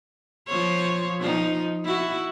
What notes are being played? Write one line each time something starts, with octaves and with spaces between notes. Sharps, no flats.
F3 C5 C#5
F3 D#4
E4 F#4